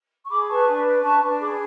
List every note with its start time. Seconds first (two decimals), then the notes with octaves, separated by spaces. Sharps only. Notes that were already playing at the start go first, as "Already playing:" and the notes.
0.25 C#6
0.30 G#4 B5 D6
0.49 B4 A5 C#6
0.68 D4
0.85 B4
1.03 D4 A5 C#6
1.22 D4
1.40 G#4 B5 D6